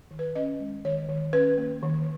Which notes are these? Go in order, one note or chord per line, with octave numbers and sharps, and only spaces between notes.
D#3
B4
C#4 D#5
G#3
D#3 C#5
D#3
C#4 B4
A#3
D#3